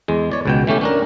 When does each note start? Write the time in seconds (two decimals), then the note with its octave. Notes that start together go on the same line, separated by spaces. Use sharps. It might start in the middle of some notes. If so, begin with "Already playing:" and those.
0.08 E2 G#3
0.32 C#5 D5
0.46 C#2 B2 G5
0.67 E3 A3 C#4 G4
0.81 C#4 D4 A#4